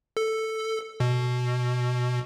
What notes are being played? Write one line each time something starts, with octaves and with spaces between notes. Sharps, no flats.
A4
B2